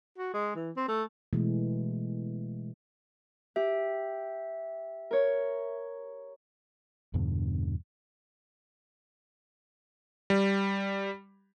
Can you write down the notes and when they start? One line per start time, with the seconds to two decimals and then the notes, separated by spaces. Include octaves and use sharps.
0.18 F#4
0.34 G#3
0.55 E3
0.77 C4
0.88 A3
1.33 B2 E3 G#3 A3
3.56 G4 E5
5.11 A#4 C#5
7.14 E2 G2 B2 D3
10.30 G3